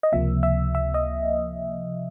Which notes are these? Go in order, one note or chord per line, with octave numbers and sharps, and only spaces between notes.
D#5
C#2 C3 F3 A#3 E5
E5
E5
D#5